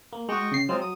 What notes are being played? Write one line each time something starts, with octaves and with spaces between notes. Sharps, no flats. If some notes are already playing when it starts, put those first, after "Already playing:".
A#3
G#3 F#4 D#5 G5 C#6
C#3 C7
F#3 G#3 C4 F4
D#6